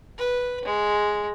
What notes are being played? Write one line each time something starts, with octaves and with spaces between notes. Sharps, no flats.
B4
G#3